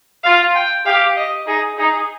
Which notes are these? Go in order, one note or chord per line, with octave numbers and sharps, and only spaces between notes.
F4 F5
G5
G4 F5
D#5
D#4 G#4
D#4 G#4